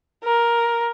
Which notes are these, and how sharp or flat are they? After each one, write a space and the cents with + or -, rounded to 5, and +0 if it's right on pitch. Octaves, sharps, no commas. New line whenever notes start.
A#4 +10